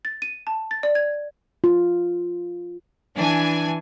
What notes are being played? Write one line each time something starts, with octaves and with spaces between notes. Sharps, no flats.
A6
D#7
A5
A6
D5
G#6
F4
E3 D4 G#5